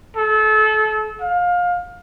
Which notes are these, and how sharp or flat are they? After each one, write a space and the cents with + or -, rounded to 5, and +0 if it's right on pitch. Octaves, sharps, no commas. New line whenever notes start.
A4 -30
F5 +25